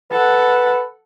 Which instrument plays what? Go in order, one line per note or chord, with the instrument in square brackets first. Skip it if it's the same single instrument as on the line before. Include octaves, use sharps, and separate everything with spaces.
[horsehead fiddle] A4 F#5 [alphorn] B4